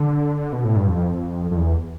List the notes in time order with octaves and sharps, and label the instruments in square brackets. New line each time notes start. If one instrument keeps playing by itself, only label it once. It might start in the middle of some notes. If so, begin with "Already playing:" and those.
Already playing: [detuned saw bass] D3
B2
A2
G2
F2
F2
E2